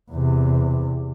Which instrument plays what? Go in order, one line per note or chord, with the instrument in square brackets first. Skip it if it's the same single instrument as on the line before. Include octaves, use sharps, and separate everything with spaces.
[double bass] E2 C3